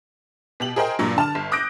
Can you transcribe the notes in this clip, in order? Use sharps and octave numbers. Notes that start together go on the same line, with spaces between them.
B2 G4 F#7
G#4 A#4 C5 D#5 G5
G2 A#2 F#3
D3 A5 F6 E7
G1
D6 D#6 F#6 G6 A#6 D7